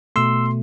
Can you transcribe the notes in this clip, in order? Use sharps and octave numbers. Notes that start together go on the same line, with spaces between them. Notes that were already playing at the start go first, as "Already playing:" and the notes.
B2 A3 C6 E6